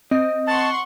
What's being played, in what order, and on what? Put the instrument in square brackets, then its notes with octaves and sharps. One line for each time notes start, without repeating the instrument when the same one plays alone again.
[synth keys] C4 [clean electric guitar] D#5
[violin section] F#5 C6 C#6 [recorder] A5